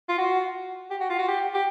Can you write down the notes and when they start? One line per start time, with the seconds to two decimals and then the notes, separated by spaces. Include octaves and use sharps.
0.09 F4
0.18 F#4
0.90 G4
1.00 F#4
1.10 F4
1.18 F#4
1.28 G4
1.54 G4